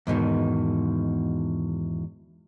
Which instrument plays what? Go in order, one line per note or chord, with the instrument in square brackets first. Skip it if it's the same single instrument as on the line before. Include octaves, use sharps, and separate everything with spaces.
[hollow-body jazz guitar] E2 G#2 B2 D#3